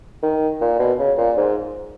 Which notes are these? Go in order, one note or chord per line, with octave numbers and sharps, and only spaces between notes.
D#3
A#2
B2
C#3
A#2
G#2